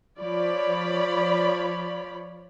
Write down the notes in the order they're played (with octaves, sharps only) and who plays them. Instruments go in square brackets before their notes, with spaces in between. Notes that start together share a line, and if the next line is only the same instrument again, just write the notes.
[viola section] F3 C#5 D5 B5